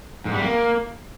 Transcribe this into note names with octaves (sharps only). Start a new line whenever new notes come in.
G#2
G3
A#3